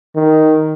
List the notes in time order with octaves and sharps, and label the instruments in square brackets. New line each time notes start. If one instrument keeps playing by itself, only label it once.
[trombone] D#3